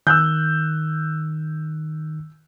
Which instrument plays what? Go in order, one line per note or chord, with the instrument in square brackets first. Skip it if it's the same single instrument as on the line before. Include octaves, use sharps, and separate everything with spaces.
[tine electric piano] D#3 [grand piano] E6 F#6 G6